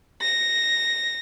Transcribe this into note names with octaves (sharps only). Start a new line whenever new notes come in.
A#6